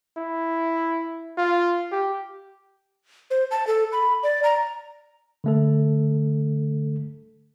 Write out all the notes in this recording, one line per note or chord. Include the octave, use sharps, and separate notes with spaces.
E4
F4
G4
C5
A5
A4
B5
D5
A#5
D3 A3 A4